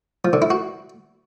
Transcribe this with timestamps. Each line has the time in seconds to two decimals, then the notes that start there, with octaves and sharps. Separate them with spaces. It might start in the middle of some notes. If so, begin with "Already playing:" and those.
0.25 F3
0.33 D3
0.42 E4
0.50 F#4